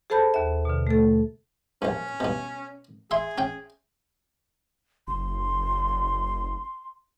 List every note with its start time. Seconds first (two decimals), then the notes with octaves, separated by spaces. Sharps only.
0.10 G#4 A4 C5 A5 B5 G6
0.34 D#2 E5
0.65 B2 D3
0.87 A3 A4
1.82 A#1 G2 C#4
2.20 G2 B2
3.11 G#4 E5 C6
3.38 C#4 G5
5.08 F#1 C6